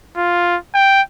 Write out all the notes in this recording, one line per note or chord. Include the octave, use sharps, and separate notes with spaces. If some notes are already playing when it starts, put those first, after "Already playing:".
F4
G5